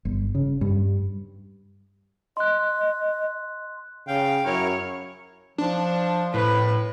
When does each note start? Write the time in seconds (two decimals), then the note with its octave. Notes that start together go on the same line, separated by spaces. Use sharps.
0.05 G1
0.35 C#3
0.61 G2
2.37 D#5 C6 F#6
4.08 C#3 F5 G5
4.45 F#2 E4 A#4 C#5 F6
5.58 F3 D4
6.34 A2 B4